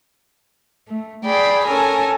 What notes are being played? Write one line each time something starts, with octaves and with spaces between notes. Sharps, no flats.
A3
G#4 D5 G5 B5
C#4 A4 A#4 G#5